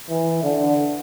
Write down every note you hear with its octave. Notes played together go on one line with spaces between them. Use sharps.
E3
D3